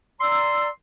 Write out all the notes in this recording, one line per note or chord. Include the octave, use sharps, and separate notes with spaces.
D5 A#5 C6 E6